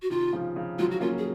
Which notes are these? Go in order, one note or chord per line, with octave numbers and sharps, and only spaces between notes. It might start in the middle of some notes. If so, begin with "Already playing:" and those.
F#4
C3 D#3 F4
C#3 F3
C#3 F3
D#3 F#3 F4
F#4
A#3 C#4 F4
G#4